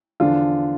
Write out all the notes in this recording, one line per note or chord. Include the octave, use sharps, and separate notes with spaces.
E2 D3 F3 D4 F4